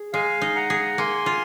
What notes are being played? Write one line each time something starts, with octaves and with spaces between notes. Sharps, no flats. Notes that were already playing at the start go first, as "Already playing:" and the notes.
Already playing: G#4
G#3 F5 G#5
D#4
F#5 A#5
G#4
A#3 G#5 C6
F4